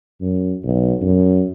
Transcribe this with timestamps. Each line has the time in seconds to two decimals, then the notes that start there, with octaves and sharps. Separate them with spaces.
0.21 F#2
0.64 B1
1.02 F#2